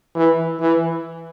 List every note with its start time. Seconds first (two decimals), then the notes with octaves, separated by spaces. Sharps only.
0.16 E3
0.60 E3